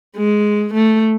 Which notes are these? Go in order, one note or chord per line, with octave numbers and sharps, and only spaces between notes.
G#3
A3